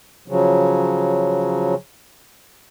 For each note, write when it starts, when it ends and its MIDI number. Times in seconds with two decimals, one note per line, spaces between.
0.28 1.75 49
0.28 1.75 53
0.28 1.75 54